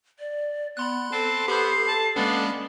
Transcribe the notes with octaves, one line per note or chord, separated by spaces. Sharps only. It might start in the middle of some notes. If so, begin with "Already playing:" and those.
D5
B3 B5 C6 F#6
C4 A4 A5 C7
B3 G4 C5 B5 G6
A5
G#3 A#3 B3 C#4 D4